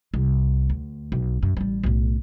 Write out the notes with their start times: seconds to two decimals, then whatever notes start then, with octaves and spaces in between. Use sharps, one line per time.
0.14 C2
0.70 D2
1.12 B1
1.43 F#2
1.57 A1 G3
1.84 B1 A2